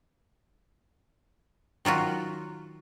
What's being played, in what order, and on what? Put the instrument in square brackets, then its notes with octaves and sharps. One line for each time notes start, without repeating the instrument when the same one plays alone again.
[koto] D#3 F#3 F4 F#4